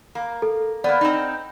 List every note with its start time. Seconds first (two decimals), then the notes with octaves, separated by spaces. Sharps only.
0.15 A#3
0.42 A4
0.84 A#3 B3 D5
1.01 C4 D#4